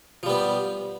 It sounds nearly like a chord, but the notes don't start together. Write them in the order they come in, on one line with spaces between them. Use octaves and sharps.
F3 G3 B3